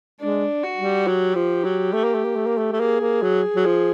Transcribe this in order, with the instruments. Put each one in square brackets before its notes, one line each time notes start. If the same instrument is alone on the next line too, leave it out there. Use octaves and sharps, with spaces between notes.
[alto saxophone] G#3 [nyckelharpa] D4
[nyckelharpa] F#4
[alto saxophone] G3
[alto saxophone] F#3 [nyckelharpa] G4
[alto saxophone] F3
F#3
A3
A#3
A3
A#3
A3
A#3
A3
A3
[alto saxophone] A#3 [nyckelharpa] G#4
[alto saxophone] A#3
F#3
F#3
F3